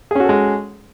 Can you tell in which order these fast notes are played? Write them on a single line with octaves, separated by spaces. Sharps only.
G#4 C#4 F#4 A4 G#3